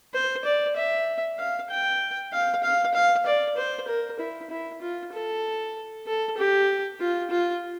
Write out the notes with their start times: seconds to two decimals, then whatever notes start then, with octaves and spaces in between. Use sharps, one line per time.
0.14 C5
0.45 D5
0.76 E5
1.38 F5
1.70 G5
2.32 F5
2.63 F5
2.94 F5
3.26 D5
3.57 C5
3.88 A#4
4.19 E4
4.50 E4
4.81 F4
5.12 A4
6.07 A4
6.38 G4
7.01 F4
7.31 F4